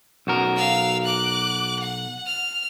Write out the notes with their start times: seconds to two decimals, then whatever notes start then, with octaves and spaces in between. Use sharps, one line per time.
0.27 B1 F#4 A#4
0.57 F5 E6
1.04 D6 F#6
1.79 F#5
2.26 F6